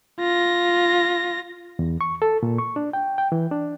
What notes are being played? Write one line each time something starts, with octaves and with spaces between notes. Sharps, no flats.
F4 A#6
E2
C#6
A4
A#2
C#6
D4
G5
G5
E3
D4